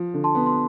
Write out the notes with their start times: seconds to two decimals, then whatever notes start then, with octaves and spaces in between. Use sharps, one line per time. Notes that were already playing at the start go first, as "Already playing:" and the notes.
Already playing: F3
0.14 D3
0.24 A5 C6
0.35 B3
0.46 C6